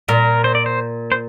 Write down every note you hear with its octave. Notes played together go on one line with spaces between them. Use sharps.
A#2 A#4
C5
D5
C5
C5